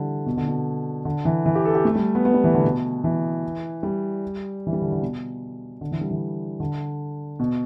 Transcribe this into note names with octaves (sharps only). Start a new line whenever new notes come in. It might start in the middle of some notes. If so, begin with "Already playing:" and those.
Already playing: D3 E3 G3
B2
D3
B2
D3
E3
E3
G4
A4
G4
A3
G3
B3
B3
G3
E3
D3
B2
E3
G3
E3
G3
D3
D3
B2
D3
E3
G3
E3
D3
B2